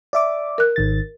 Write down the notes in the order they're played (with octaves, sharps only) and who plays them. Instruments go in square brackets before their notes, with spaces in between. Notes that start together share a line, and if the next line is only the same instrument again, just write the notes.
[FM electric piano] D5 E5 D6
[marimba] A#4 F#6
[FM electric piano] G#1 D#3 A6